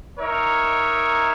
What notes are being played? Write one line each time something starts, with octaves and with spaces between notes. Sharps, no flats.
D#4 A#4 C#5 E5